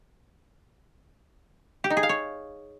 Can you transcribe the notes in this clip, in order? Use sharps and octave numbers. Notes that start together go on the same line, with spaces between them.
G4
D#4
G#4
F5
C#5